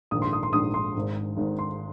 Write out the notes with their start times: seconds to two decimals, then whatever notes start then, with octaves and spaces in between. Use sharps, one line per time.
0.11 A#1 G#2 D#3 D#6
0.22 C6
0.33 D#6
0.43 C6
0.53 A#1 G#2 D#3 D#6
0.74 C6
0.95 G#1 G#2 D#3
1.37 G#1 G#2 D#3
1.59 C6